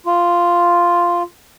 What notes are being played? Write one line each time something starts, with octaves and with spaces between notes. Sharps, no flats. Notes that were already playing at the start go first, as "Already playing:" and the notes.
F4